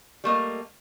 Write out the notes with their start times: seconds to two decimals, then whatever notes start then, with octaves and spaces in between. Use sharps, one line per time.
0.24 G3 A3 A#3 D#5